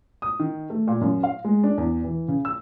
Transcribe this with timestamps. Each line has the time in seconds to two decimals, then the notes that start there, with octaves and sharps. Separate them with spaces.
0.22 D#6
0.39 D#3
0.70 A3
0.87 A#2
1.01 F#2
1.23 F5
1.45 G#3
1.64 D4
1.78 E2
2.04 E3
2.28 C#3
2.45 E6